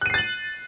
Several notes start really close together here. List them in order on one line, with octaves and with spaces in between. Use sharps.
F#6 D#7 C7 A6 F#7